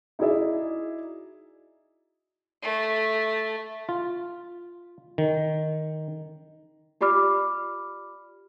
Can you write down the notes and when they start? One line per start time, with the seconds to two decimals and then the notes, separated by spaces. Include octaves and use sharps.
0.19 D#4 E4 F#4 G#4 D5 E5
2.62 A3
3.89 F4
5.18 D#3
7.01 F4 G4 D5 B5 D6 F6